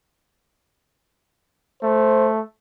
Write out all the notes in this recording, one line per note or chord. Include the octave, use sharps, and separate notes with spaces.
A3 C5